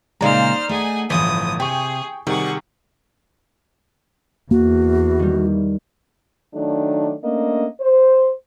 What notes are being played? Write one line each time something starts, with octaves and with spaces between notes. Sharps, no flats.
A#2 C#3 G#3 D#4 C5 D5 A#5 F6
A3 G#4 F#5 G#5
G1 A2 E3 F3 D#6
C3 G#4 G5 C#6
C3 D#3 G3 G#4 F#5 C#6
E2 A#3 F#4
D#3 G3
D#3 F#3 A3 D4
A3 A#3 C#4 D4 D#5
C5